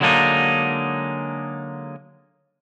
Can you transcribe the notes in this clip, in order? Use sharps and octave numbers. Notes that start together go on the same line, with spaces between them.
D3 F#3 G#3 A#3 D4 D#4